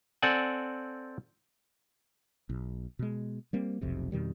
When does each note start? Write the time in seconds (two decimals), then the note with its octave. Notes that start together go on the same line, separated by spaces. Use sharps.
0.22 C4 A4 D5 F#5 G#5
2.49 B1
2.99 B2 G#3
3.53 G3 A#3 C4
3.82 F1 B1 F2 C3
4.12 F2 B2 D#3 G3